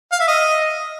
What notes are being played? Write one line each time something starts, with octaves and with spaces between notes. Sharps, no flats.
F5
E5
D#5